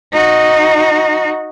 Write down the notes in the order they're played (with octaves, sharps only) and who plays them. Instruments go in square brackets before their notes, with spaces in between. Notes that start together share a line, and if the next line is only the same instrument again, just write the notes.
[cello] D#4 F#4